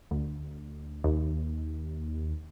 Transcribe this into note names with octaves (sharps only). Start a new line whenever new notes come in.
D2
D#2